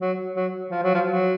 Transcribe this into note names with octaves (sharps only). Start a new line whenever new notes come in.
F#3
F#3
F3
F#3
F3
F#3